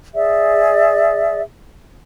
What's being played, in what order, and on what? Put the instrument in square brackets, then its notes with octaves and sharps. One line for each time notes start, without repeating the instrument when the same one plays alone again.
[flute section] G#4 D5 E5